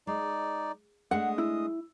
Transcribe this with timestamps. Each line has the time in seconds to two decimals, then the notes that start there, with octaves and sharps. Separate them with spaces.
0.07 G#3 D#4 D5
1.11 G#3 A3 D4 D#5 F#5 D#6
1.38 E4